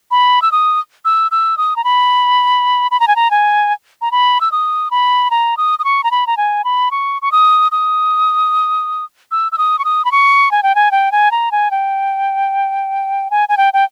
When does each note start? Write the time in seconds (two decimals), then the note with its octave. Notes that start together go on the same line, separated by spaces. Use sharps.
0.11 B5
0.42 E6
0.52 D#6
1.05 E6
1.31 E6
1.57 D#6
1.76 A#5
1.84 B5
2.91 B5
3.00 A#5
3.08 G#5
3.16 A#5
3.31 G#5
4.01 A#5
4.12 B5
4.41 E6
4.52 D#6
4.91 B5
5.31 A#5
5.57 D#6
5.79 D#6
5.84 C#6
6.04 A#5
6.11 B5
6.27 A#5
6.37 G#5
6.64 B5
6.91 C#6
7.22 C#6
7.32 D#6
7.72 D#6
9.31 E6
9.52 E6
9.58 D#6
9.79 C#6
9.85 D#6
10.05 B5
10.12 C#6
10.51 G#5
10.63 G5
10.75 G#5
10.91 G5
11.12 G#5
11.31 A#5
11.52 G#5
11.71 G5
13.31 G#5
13.49 G#5
13.57 G5
13.74 G5